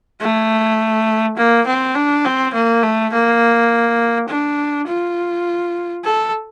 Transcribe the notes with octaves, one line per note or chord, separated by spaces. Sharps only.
A3
A#3
C4
D4
C4
A#3
A3
A#3
D4
F4
A4